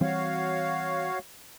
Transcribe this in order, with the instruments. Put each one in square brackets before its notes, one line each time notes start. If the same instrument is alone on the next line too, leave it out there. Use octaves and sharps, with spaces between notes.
[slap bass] E3 G3 C4 [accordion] F#4 C#5 F5